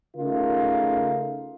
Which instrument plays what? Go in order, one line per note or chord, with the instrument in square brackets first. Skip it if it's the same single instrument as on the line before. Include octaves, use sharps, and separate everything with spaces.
[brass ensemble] C#3 A3 D#4 F4 A#4